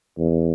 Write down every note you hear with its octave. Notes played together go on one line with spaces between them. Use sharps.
E2